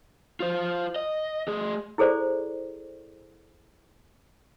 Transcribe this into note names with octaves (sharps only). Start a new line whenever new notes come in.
F4 C5
D#5
A3 G#4
E4 G#4 A4 C5 D5